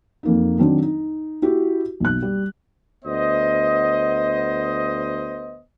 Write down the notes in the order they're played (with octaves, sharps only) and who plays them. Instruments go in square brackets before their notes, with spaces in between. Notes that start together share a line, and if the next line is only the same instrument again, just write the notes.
[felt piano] F2 A#3 D#4
D#3 F#3 C4 D4
D#4
E4 F#4 G4
B1 F#6
G3
[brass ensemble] D2 B3 C5 D#5